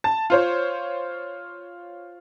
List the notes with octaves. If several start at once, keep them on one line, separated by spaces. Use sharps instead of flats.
A5
F4 C5 C#5